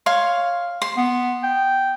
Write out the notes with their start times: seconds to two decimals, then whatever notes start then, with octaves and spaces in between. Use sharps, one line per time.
0.06 C#5 F5 C6
0.82 C6
0.97 B3
1.43 G5